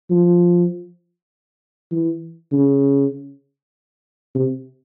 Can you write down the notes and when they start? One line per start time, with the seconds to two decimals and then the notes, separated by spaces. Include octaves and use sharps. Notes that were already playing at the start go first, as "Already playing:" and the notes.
0.10 F3
1.91 E3
2.52 C#3
4.35 C3